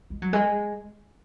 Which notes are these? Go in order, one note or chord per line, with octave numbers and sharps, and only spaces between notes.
G#3
F#3
G#3